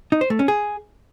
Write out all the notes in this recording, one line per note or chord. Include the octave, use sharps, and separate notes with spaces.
D#4
C5
A3
C#4
G#4